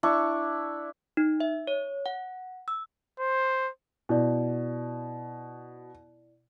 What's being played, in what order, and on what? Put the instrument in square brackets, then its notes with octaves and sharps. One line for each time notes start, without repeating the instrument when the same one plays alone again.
[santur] D4 E4 C#6
[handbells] D#4
E5
C#5
F#5
E6
[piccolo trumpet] C5
[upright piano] B2 [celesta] E4 D5